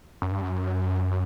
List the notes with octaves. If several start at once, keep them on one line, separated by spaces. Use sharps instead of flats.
F#2
G2
F#2